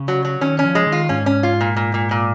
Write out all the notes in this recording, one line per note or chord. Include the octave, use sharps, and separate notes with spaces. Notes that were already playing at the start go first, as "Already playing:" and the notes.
Already playing: C#3
F#3
F#3
D#3 C#4
C#4
F3
G#3
D#3
F4
G#2 C#4
C#4
F4
A#2
A#2
A#2
A#2